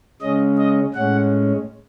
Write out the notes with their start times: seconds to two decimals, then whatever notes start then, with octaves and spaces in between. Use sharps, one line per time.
0.22 C#3 G#3 C#4 D#5
0.58 D#5
0.94 A2 G#3 C#4 F#5